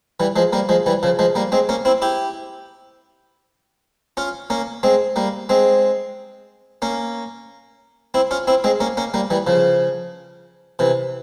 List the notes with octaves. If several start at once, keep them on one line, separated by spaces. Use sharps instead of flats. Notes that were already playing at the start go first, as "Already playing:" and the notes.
E3 G3
F3 G#3
G3 A#3
F3 G#3
E3 G3
C#3 F3
F3 G#3
G3 A#3
G#3 C4
A#3 C#4
C4 E4
E4 G4
C#4 F4
A#3 C#4
G#3 C4
G3 A#3
G#3 C4
A#3 C#4
C4 E4
C#4 F4
C4 E4
G#3 C4
A#3 C#4
A#3 C#4
G3 A#3
E3 G3
C#3 F3
C3 E3